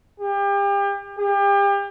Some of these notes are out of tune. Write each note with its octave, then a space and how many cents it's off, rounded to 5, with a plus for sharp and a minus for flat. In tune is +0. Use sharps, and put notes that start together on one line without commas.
G4 +35
G4 +35